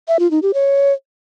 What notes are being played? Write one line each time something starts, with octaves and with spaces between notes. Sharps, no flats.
E5
F4
D#4
G4
C#5